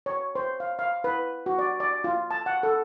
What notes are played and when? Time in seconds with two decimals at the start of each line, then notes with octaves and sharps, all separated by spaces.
0.06 C#5
0.35 C5
0.60 F5
0.79 F5
1.04 B4
1.46 F#4
1.59 D5
1.80 D5
2.04 F4
2.31 A5
2.46 F#5
2.63 A4